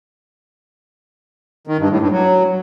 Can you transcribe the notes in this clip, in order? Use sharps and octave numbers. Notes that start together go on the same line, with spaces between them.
D#3
G2
A2
G2
F#3